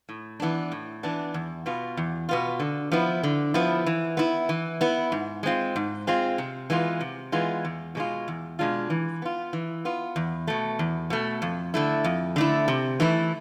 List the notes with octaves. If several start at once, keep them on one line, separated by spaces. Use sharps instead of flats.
A2
E3 B3 D4
A2
E3 B3 D4
E2
B2 B3 F4
E2
B2 B3 F4
D3
F3 B3 E4
D3
F3 B3 E4
E3
B3 E4
E3
B3 E4
G#2
G#3 C4 F4
G#2
G#3 C4 F4
C3
E3 G#3 B3 F4
C3
E3 G#3 B3 F4
E2
B2 G#3 D4 F4
E2
B2 G#3 D4 F4
E3
B3 F4
E3
B3 F4
E2
B2 A3
E2
B2 A3
F2
D3 A3 E4
F2
D3 A3 E4
C3
E3 A3 E4